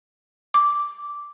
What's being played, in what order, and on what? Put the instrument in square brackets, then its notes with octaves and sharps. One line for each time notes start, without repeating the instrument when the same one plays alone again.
[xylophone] D6